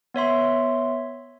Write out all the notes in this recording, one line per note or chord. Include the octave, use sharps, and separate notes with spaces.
B3 C#5 E5 C6